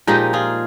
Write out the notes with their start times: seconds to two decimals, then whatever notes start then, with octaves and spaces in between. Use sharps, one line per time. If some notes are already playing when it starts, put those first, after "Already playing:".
0.07 A#2 F3 G#3 D#4 G4
0.33 F4 G#4